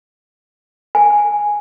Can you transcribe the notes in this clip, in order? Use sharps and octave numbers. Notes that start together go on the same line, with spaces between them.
G#5